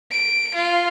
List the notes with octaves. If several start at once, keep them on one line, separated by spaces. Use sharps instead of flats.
D7
F4